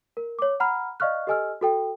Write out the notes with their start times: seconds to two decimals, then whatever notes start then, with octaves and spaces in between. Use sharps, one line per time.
0.17 A#4
0.39 C#5 D6
0.60 F#5 A#5 B5 F6
1.00 D5 D#5 F5 C#6 F6 F#6
1.27 G4 A4 D#5 G#5 E6 F6
1.61 F#4 A4 G5